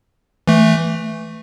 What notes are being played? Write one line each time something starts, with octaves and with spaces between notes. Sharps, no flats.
E3 A3